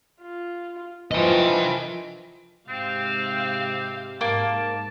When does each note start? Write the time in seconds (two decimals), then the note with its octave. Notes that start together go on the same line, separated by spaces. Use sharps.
0.22 F4
1.12 E3 F3 D#5 G5
2.69 G#2 C3 C4 G4 F5
4.21 G#2 A#3 A5